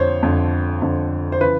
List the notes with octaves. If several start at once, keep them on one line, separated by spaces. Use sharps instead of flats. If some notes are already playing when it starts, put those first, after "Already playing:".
Already playing: F2 D3 C5 C#5
F2 D3
F2 D3
C5
C#3 E3 B4